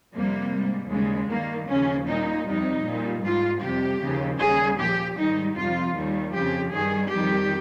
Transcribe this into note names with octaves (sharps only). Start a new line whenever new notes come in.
F2 C3 G3 A#3
G#2 G3
D#2 C#3 G3 G#3
G2 D#3 G3 A#3
D#2 C#3 F3 C#4
A#2 G3 D#4
F2 C3 G3 D#4
A#2 G3
G#2 G3 F4
F2 C3 G3 G4
D#2 C#3 F3
D#2 C#3 G3 G#4
A#2 F3 G4
G#2 D#3 G3 D#4
F2 C3 G3 F4
D#2 D#3 G3
F2 C#3 F3 G4
G2 D#3 G3 G#4
F2 D#3 G3 G4